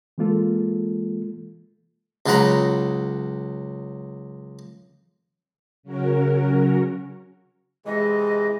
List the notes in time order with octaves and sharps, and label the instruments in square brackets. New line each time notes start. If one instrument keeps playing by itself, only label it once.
[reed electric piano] E3 G#3 A#3 F4 A4
[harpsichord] C#2 C#3 F#3 F#5 A#5 B5
[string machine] C#3 F#3 C#4 F#4 A#4
[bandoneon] C3 E3 [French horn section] G#3 [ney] D#5